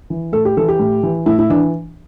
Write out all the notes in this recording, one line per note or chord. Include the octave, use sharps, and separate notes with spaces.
E3
A2 A4
G4
E3 A4
G4
A2
E3
A2 E4
E4
E3 D4